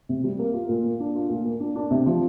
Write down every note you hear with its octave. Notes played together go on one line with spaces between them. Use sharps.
C3
G3
A#3
F4
A#2
A#3
D4
F4
A#2
A#3
D4
D4
C3
F3